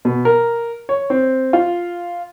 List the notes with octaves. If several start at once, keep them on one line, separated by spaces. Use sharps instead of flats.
B2
A#4
C#5
C4
F4